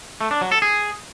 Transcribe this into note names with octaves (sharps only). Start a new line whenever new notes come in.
A3
D4
F#3
A4
G#4